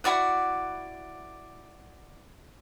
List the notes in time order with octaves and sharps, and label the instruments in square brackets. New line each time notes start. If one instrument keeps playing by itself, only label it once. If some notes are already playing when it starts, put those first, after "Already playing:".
[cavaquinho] E4 F#4 D5 F#5